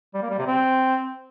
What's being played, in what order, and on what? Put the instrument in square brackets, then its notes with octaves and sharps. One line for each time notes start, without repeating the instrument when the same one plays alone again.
[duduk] G3
A#3
G3
C3
C4